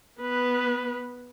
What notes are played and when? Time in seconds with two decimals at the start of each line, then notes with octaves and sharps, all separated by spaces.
0.21 B3 B4